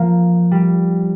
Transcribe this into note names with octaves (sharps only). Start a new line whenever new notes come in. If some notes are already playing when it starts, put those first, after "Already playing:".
Already playing: F3 A#3
G3